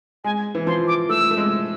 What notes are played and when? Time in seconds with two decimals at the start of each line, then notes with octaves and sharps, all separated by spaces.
0.24 G#3 G#5
0.55 E3
0.67 F3 C6
0.88 D6
1.09 A3 E6
1.31 A3
1.37 G#3